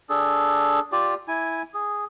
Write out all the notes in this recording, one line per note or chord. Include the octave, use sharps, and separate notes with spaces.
D4 G#4 A4
F4 G4 D5
E4 G#5
G#4